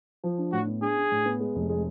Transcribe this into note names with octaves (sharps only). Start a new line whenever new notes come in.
F3
D4
A2 F#4
B3
D4 G#4
D4
A2
B3
G#3
F1
G#3